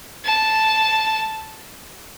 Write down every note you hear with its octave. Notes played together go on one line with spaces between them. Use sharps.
A5